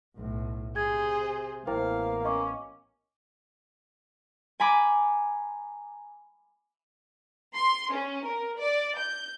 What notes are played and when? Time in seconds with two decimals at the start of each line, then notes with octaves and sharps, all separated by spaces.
0.17 B1 A2
0.76 C3 G#4 C5 G#6
1.67 A1 A#3 B3 E4 C5 F5 G5
2.25 C#4 D#5 C#6 D6
4.60 G#5 A#5 B5 D6
7.55 C6
7.92 C#4
8.25 A#4
8.59 D5
8.99 G6